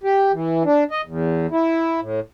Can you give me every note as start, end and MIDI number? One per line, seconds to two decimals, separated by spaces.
0.03 0.32 67
0.33 0.63 52
0.65 0.84 62
0.91 1.01 75
1.05 1.47 40
1.51 2.00 64
2.00 2.20 45